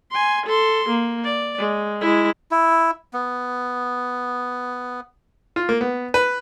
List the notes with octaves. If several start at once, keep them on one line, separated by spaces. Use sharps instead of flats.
G#5 C6
A4 C6
A#3
D5
G#3
G#3 E4
E4
B3
F4
A#3
B3
B4